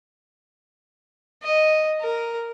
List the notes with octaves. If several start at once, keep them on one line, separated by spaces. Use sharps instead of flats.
D#5
A#4